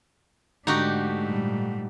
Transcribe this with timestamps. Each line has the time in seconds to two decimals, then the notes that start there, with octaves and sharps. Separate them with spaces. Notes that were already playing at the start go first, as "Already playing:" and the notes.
0.67 G#2 D3 A3 D4 D#4 F#4 G4
1.24 A#2 G3